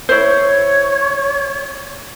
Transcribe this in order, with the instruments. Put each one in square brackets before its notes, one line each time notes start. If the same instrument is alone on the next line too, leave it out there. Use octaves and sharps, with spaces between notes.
[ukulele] E4 C5 [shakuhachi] C#5